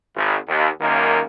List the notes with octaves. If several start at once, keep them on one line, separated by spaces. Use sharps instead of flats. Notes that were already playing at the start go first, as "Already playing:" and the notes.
G#1
D#2
C#2 F#2 D#3 A#3